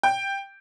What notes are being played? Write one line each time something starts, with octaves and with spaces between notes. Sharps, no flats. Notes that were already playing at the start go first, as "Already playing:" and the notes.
G5